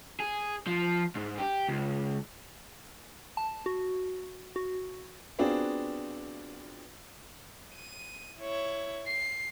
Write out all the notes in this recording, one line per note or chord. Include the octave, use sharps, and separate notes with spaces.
G#4
F3
G#2
G4
C#2
A5
F#4
F#4
B3 C4 D4 F4 F#4 G#4
D#7
E4 C#5
C7